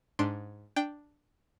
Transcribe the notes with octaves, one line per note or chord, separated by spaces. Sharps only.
G#2 D4 C6 D7
D4 G5